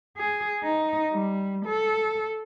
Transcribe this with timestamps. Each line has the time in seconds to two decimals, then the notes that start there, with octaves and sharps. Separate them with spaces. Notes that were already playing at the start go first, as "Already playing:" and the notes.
0.17 G#4
0.63 D#4
1.12 G3
1.66 A4